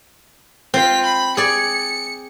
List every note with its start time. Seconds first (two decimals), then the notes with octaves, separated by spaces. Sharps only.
0.74 C4 F4 B6
1.05 B5
1.37 G#4 D5 C#7